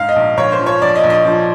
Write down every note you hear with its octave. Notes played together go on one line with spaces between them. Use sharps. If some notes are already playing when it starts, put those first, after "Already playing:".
Already playing: G#2 F5
D#5
A#1
A#1 C#5
C5
F3
C#5
A#1 D5
D#5
A#1
D#5
F3